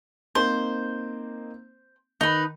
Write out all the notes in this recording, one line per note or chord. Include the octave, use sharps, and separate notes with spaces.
A#3 C4 D#4 C5
D#3 D#4 B4